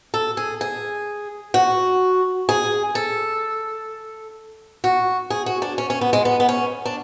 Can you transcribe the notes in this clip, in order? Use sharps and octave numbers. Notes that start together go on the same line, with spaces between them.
A4
G#4
G#4
F#4
G#4
A4
F#4
G#4
F#4
D4
C#4
C#4
B3
G#3
B3
B3
C#4
D4